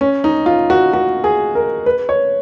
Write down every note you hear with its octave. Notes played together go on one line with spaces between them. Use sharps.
C#4
D#4
F4
F#4
F#4
G#4
A#4
B4
C#5